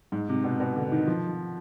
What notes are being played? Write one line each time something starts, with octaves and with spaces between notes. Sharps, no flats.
G#2
C3
B2
B2
D3
D#3
F3